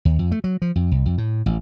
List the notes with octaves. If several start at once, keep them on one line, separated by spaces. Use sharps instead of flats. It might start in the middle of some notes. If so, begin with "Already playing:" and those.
D#2
F2
A3
F#3
F3
F2
C2
F2
A2
A1